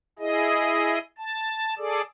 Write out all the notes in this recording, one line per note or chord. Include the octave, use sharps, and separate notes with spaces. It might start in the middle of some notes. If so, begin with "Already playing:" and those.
E4 G#4 D#5
A5
G#4 A4 D5